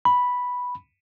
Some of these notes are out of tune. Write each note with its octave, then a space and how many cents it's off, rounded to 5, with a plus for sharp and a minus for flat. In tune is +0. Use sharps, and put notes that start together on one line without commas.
B5 -5